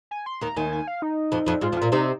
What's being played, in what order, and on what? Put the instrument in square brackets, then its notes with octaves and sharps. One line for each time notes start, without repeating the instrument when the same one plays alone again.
[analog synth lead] G#5
C6
[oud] D#2 D#3 [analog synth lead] A#5
[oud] D#2 D#3 [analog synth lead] G#5
[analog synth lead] G#5
F5
D#4
[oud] F2 F3
F2 F3
[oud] G#2 G#3 [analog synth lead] F4
[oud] F2 F3
[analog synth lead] F4
[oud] A#2 A#3
[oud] C3 C4 [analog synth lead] D#4